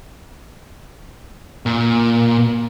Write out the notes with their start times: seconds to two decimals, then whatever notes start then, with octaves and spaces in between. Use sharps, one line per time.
1.66 A#2